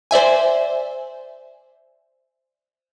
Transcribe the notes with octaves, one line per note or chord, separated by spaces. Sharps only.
C5 D5 E5 G#5